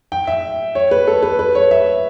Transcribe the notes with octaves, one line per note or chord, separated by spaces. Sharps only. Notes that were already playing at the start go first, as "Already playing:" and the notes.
G5
E5
C#5
B4
A4
B4
B4
C#5
E5